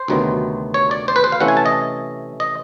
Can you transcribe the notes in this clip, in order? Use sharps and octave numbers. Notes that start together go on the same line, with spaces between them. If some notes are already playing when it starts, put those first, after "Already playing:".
Already playing: C5
D2 C3 D#3 F#3 B3
C#5
D5
C5
B4
C5
F5
C3 E3 A3 C#4 E4 F#5
G#5
A5
D#5
D#5